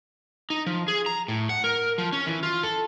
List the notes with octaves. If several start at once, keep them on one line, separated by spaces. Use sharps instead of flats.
D#4
F3
G#4
A#5
A2
F#5
A#4
F3
C#4
E3
F4
A4